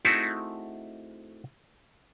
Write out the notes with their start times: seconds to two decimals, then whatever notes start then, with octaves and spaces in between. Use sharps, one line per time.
0.05 A3 C4 D#4 E4 F#4 G#4